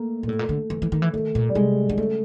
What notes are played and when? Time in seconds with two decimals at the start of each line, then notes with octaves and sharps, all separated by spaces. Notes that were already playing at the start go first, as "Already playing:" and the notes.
Already playing: A3 A#3
0.23 A#2
0.28 A2 A3
0.39 A#2
0.49 D3
0.70 E3
0.82 E3
0.92 D#3
1.02 E3
1.13 D#3 A3
1.35 A#2
1.49 G3
1.55 C3 G#3
1.89 D3
1.98 C#3 A3